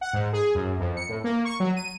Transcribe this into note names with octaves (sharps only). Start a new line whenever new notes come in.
F#5
G#2
G#4
F#2
F2
C#7
A2
A#3
C#6
F#3
D#7